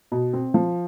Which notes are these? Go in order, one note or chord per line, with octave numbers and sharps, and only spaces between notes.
B2
C4
F3